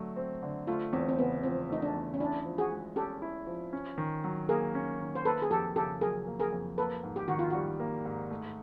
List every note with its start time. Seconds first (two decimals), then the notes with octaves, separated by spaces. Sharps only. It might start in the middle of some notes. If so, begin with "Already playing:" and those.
Already playing: D3 F#3 A3
0.16 C4
0.42 D3
0.67 A3 F4
0.93 E2 C4
1.09 C4
1.18 C#3 B3
1.43 F3 C4
1.70 A3 D#4
1.82 D4
1.95 E2
2.14 C#4
2.20 D4 E4
2.45 F3
2.58 F#4 G#4
2.71 G#3
2.96 C#4 G4 A4
3.22 E4
3.47 F3
3.73 C#4
3.98 D#3
4.24 F#3
4.49 A#3 G#4 A#4
4.75 C#4
5.00 D#3
5.15 C5
5.25 A#3 A4 B4
5.42 G#4
5.50 F2 G4 A4
5.76 C#3 G4 A4
6.01 F#3 G#4 A#4
6.27 A#3
6.40 G#4 A#4
6.53 F2
6.78 A#3 A4 B4
7.03 G#2
7.16 G4
7.28 D#3 F#4
7.39 F4
7.50 G3 F#4
7.80 A#3
8.05 G#2
8.31 A3